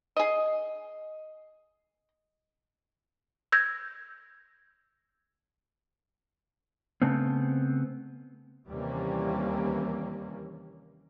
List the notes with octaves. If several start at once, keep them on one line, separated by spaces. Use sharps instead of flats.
G#4 D#5
E6 G6 G#6 A#6
C#3 A3 B3 C4
D#2 C3 E3 G3 A#3 C#4